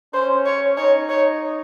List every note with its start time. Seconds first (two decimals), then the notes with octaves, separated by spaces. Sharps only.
0.14 C#4 C5
0.46 C#5
0.78 D#4 C#5
1.10 C#5